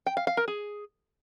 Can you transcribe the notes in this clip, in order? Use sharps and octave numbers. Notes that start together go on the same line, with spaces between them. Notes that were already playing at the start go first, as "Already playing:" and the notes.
G5
F5
F5
A#4
G#4